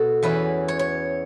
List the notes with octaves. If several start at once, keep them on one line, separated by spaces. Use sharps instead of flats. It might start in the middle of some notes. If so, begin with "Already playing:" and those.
Already playing: B2 F#4 A4
E2 E3 C#4 E4 B4
C#5
C#5